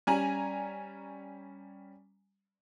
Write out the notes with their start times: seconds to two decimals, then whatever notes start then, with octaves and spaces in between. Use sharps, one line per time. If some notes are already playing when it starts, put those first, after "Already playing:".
0.07 G3 C#4 G#5 A#5 F#7